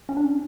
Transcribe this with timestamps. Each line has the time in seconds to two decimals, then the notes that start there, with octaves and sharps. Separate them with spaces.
0.09 C#4
0.17 D4
0.25 C#4